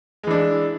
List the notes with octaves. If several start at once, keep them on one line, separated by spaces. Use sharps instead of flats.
E3 G#3 D4 E4